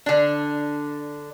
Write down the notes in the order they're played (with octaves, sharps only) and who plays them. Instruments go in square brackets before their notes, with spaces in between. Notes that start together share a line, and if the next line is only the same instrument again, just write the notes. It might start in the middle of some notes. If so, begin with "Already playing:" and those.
[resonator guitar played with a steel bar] D3 D4